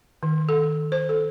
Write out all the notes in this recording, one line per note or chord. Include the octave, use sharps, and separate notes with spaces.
D#3
A4
C5
A4